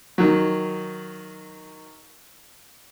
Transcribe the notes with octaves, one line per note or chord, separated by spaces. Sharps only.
D#3 F#3